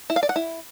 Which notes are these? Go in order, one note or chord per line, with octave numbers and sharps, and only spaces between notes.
E4
F5
D5
F#5
E4